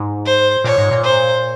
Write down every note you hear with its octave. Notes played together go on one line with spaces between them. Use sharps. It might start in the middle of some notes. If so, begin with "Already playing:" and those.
Already playing: G#2
C5
A#2 C#5
G#2
A#2
C5